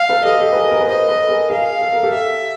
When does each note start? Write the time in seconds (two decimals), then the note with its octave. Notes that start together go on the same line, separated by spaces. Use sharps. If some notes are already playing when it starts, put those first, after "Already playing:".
Already playing: F5
0.09 A4 B4
0.25 G4 A4 D#5
0.40 G4 A4
0.52 B4
0.55 G#4 A#4
0.71 G#4 A#4
0.81 B4
0.87 A#4 C5 D#5
1.08 A4 B4
1.29 G#4 A#4
1.50 G#4 A#4 F5
1.81 A4
1.92 A#4
2.03 G4 A4
2.13 E5